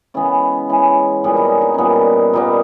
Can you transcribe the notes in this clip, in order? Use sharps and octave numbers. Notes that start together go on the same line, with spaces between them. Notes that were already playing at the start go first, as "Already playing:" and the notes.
C#3 E3 G#3 B3 C#4
C#3 E3 G#3 B3
A#2 G3 B3 C#4
D#4
C#4
D#4
A#2 G3 B3 C#4
A#2 G3 B3 D#4